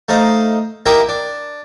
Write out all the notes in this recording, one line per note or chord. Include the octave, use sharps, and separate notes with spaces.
A3 D#4 C5 F5
A#3 E4 G4 A#4 D#5 E5
D4